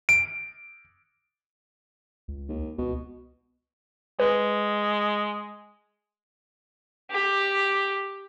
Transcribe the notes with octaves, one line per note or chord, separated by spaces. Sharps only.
D7
C#2
D#2
C#2 B2
G#3 B4
G4